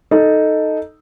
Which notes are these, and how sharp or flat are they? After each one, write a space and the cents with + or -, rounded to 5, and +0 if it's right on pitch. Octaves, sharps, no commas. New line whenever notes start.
D#4 +0 A4 +0